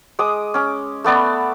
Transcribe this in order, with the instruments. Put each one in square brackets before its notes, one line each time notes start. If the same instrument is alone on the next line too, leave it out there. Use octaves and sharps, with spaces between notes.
[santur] G#3 D6 D#6
C#4 D6
A3 B3 D5 B5